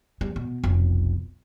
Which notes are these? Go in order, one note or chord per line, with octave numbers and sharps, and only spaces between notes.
G3
B2
F1 B1